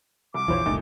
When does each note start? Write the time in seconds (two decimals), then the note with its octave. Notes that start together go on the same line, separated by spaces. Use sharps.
0.34 C2 D6
0.48 A#1 E2 E3 F4 C5 C#5
0.66 F1 C2 A#2 A3 D#4